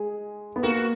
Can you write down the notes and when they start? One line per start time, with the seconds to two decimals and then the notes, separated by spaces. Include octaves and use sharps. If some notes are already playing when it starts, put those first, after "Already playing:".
Already playing: G#3 G#4
0.56 B3
0.63 A#3 F#4